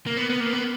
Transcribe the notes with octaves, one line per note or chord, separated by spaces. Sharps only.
A#3
B3
B3
A#3
B3